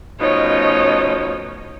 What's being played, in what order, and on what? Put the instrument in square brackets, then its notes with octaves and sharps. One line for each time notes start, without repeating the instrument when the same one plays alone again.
[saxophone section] B2 F3 D#4 [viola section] A3 C#4 D#5 [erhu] C#5